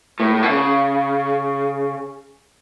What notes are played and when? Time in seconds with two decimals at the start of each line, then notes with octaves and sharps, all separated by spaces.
0.20 A2
0.35 A2
0.43 B2
0.49 C#3